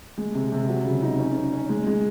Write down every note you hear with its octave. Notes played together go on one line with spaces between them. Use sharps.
G#3
C3
C3
F#3
C#3
D#4
C#4
C#4
C#4
G#3
G#3